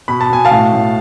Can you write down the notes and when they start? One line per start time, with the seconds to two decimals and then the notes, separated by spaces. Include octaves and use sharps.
0.08 B2 B5
0.21 A5
0.30 B2 G#5
0.45 F5 A5
0.51 A2
0.73 A2